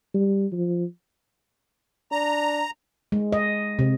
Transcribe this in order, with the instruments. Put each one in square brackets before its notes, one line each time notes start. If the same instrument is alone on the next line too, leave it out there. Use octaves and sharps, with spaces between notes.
[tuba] G3
F3
[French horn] D4 [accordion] A#5
[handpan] G#3
D#5
C3